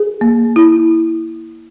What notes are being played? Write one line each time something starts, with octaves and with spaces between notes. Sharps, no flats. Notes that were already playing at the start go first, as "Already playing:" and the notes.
Already playing: G#4
A#3
E4